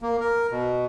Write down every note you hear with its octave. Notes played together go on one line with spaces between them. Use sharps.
A#3
A#4
B2